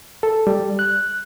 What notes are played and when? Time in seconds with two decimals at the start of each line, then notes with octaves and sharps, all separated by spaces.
0.23 A4
0.47 G3
0.79 F#6